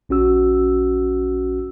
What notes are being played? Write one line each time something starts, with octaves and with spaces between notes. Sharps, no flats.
A#1 C#4 F#4 E6